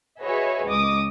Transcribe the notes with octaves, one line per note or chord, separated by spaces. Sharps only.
F#4 G#4 B4 C#5 D#5 E5
C#2 D#5 D6 D#6